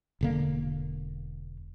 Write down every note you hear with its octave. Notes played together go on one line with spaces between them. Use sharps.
E1 D3 A#3